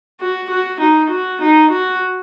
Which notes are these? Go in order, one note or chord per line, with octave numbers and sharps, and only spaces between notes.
F#4
F#4
D#4
F#4
D#4
F#4